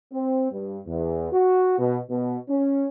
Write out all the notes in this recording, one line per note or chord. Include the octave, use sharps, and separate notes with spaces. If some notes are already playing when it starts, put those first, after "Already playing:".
C4
G2
E2
F#4
B2
B2
C#4